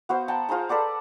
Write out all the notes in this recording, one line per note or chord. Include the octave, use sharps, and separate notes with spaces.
B3 F#4 C5 F5
F#5 G5 A5 A#5
F4 G#4 C5 A#5
A4 B4 D5 F#5